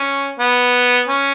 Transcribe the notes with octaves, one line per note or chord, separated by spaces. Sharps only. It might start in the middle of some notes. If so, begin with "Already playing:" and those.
Already playing: C#4
B3
C#4